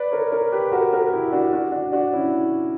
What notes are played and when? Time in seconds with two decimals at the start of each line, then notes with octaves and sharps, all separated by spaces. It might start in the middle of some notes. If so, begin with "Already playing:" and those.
Already playing: B4 D5
0.12 A#4 C#5
0.32 A#4 C#5
0.52 G4 B4
0.72 F#4 A#4
0.93 F#4 A#4
1.13 E4 G4
1.32 D4 F#4
1.52 D4 F#4
1.72 D4 F#4
1.92 D4 F#4
2.12 C#4 E4